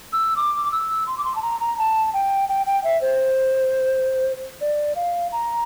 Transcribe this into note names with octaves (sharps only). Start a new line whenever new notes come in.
E6
D6
E6
C6
D6
C6
A5
A#5
A#5
A5
G5
G5
G5
E5
C5
D5
F5
A#5